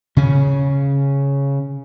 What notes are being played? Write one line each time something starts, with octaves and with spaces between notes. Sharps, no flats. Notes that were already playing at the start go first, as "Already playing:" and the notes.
C#3 C#4